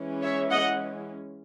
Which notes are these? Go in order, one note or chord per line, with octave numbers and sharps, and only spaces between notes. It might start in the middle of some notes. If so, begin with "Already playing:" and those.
Already playing: E3 G#3 C#4
C#5 E5
D#5 F#5